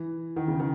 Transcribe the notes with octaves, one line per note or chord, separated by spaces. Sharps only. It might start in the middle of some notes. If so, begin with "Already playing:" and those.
Already playing: E3
D#3
C#3
D#3